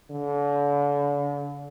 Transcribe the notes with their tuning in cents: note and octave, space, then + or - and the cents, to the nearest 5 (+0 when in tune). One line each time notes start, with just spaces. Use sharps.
D3 -40